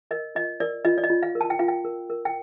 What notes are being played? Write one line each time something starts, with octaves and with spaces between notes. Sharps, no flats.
A#4 D#5
F4 D#5
A#4 D5
F4 D#5
D5
D#5
F4
F5
A#4
A5
G5
F4 F5
G5
A#4
A#4
G5